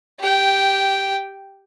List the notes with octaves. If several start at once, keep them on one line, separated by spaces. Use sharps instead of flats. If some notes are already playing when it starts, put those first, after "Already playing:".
G4 G5